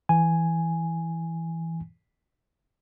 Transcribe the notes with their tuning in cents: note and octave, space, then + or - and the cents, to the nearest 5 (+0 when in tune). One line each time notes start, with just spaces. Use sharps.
E3 +0 G#5 +0